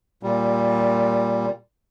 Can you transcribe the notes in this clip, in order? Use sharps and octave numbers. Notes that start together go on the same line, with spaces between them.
A#2 G3